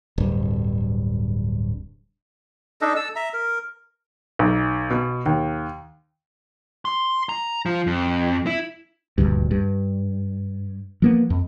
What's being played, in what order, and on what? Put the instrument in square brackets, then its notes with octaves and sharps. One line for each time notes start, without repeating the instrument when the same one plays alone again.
[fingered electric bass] D1 G2
[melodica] D4 D#4 A4 D#5
A4 A5 E6
E5 A#5
A#4
[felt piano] B1
B2
D#2
[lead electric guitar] C6
A#5
F3
F2
E4
[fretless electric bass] D#1 G#1 D2 G2
G2
F3 A#3 B3
F2